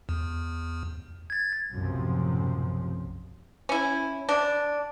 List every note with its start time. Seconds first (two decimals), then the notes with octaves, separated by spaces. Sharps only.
0.09 E2
1.30 G#6 A6
1.71 B1 F#2 A2 C3 F3
3.69 C#4 E4
4.29 D4